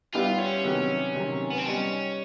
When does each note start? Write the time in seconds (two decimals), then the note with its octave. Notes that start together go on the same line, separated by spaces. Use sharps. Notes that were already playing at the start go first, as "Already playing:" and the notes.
0.13 G3 B3 E4 F4 G4
0.39 C#4
0.64 C3 D#3 F#3 B3
1.15 C3 D#3 F#3 A#3
1.50 B3
1.58 C4
1.66 G3 B3 C#4 D#4